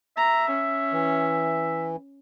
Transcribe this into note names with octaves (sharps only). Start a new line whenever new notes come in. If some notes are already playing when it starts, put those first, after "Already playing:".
E5 A#5
C#4
E3